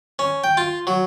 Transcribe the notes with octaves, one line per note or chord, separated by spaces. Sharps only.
C#4
G5
F4
F#3